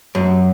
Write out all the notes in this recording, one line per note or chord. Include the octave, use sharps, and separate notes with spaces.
F#2